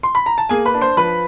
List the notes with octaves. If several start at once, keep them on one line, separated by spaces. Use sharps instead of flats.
C6
B5
A#5
A5
A#3 G#4 G#5
B4 B5
D4
C5 C6
F3 B4 B5